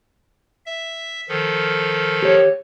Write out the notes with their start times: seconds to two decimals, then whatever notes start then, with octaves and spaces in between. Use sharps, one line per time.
0.66 E5
1.29 D#3 F3 A4
2.23 G4 C#5